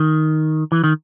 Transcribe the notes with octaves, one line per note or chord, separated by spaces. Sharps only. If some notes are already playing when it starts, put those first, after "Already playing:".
Already playing: D#3
E3
D#3